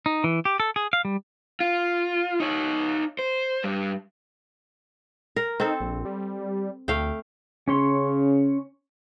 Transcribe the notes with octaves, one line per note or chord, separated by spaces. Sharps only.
D#4
E3
G4
A4
G#4
F5
G3
F4
D#4 C#5
C5
G2 G3
A#4
C4 D#4 A4
A#1
G3
D2 A3 F5 G5
C#3 C#4 C#5 C6